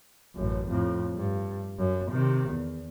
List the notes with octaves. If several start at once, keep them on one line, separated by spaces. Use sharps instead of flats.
A1 F#2
F2 A2
G2
F#2
C3 D#3
E2